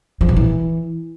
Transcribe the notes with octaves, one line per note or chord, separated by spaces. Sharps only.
F3
B2
E3